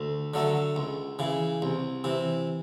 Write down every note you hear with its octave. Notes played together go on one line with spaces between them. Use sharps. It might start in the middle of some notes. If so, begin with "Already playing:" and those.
Already playing: D2
D3 F#3 A3
C#2
C#3 E3
C2
C3 E3